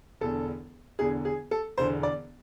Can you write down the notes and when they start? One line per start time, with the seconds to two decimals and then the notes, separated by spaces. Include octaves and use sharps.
0.21 E1 E2 D3 A4
0.99 E1 E2 D3 G#4
1.25 G#4
1.51 A4
1.78 E1 E2 D3 C5
2.03 D5